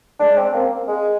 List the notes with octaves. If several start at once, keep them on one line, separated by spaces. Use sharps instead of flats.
G#3 D4
C4
A#3 C4
G#3 G#4